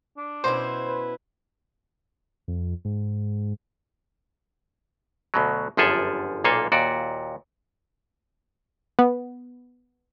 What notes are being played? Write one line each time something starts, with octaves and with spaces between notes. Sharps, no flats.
D4
B2 C#4 E4 C5 C6
B4
F2
G#2
D2 B2 F#3
G1 F#2 F3 G#4 A4 E5
B1 A#2 A#3 A4 F5 G#5
D#2 A#2 F#4 D5
B3